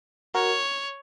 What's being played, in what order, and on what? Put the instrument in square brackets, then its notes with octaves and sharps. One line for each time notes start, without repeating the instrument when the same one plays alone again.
[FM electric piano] F#4 A#4 [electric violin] C#5